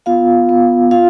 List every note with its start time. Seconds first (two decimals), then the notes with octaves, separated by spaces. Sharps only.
0.06 B3 F4 F5
0.49 B3
0.91 F4 F5